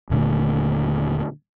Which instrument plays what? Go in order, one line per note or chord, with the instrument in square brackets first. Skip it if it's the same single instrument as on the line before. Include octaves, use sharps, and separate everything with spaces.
[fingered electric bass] D#1 A#2 D3 A3